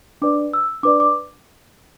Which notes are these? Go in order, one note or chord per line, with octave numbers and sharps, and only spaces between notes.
D4 B4 D5 D6
E6
D4 B4 D5 D6
D6